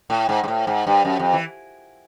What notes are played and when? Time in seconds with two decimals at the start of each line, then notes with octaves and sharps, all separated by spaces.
0.10 A2
0.29 G#2
0.44 G#2
0.48 A2
0.67 G#2
0.87 G2
1.05 F#2
1.19 F2
1.33 E3